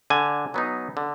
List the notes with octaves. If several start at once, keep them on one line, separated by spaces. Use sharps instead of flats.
D3 G#5
F#3 B3 D#4
D3